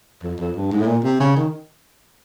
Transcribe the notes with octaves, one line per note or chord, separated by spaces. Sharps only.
F2
F2
G2
G#2
A2
A#2
C3
C#3
D#3